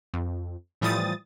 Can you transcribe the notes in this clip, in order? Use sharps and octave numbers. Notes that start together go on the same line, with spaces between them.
F2
A2 E3 F3 G3 D#6 A6